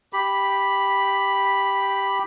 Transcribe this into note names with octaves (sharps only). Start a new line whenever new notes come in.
G4 B5